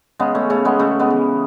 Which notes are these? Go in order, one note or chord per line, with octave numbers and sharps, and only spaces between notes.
C#3 G#3 B3
A3 C#4
C#3 A3 C#4
G#3 B3
C#3 A3
G#3 B3
E3